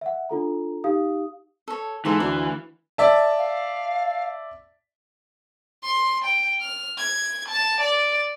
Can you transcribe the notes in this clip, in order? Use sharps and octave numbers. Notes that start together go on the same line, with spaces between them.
E5 F#5
D4 F4 A4 A#5
D#4 G4 F5 D#6
A4 C#5
G#2 E3 F4 A4
D2 F5
D5 E5 A5
F5
C6
G5
F6
G#6
A5
D5